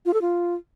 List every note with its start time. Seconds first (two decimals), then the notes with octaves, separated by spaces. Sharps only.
0.06 F4
0.14 A4
0.22 F4